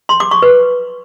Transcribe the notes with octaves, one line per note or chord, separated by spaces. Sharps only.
C6
D6
C#6
B4